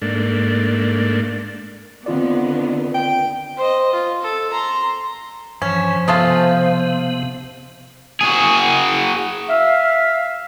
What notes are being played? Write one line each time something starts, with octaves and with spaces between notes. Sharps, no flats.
G#2 A3 A#3 D4
D3 D#3 B3 C4 F4 D5
G5
C5 D#5
F4
A4
A#5 C6
G2 E3 F3 C#4
C3 G#3 A3 B3 F4 C5 F5
F#4 G#4
E5 F5